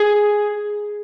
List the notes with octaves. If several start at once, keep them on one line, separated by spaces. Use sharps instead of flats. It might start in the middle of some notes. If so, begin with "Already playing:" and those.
Already playing: G#4